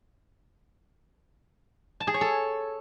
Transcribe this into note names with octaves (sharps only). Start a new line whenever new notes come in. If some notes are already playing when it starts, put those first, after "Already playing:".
A5
G#4
C#5
A4